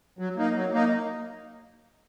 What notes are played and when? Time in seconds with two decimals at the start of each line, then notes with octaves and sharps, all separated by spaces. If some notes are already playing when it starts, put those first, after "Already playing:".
0.19 F#3
0.37 A#3 D#4
0.55 F#3
0.73 A#3 D#4